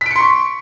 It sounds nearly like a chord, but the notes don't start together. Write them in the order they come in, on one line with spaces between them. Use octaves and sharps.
B6 D7 C#7 C6 C#6